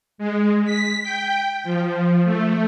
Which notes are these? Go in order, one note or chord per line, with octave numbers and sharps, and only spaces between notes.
G#3
B6
G5
F3
A3